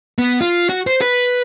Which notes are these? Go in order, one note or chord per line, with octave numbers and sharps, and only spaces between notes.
B3
F4
F#4
C5
B4